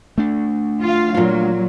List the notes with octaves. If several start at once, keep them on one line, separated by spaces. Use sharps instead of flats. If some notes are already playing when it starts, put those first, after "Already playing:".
A3 D4
F4 F5
A#2 F#3 F4